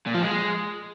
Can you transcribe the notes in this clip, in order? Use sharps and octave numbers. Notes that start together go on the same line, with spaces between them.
A#2
F3
G#3